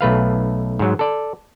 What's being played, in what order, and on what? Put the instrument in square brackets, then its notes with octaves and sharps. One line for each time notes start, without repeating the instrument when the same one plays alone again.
[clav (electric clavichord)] B1 A3 B4 F5
G#2 F#3
A4 D5